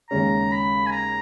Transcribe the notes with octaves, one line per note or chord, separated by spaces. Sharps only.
D#2 C#3 G#3 C#4 A#5
B5
G#5
A#5